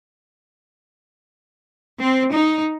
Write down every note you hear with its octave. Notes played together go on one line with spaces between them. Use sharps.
C4
D#4